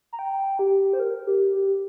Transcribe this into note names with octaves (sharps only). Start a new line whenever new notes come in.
A#5
G5
G4
C5
A#4
G4
G4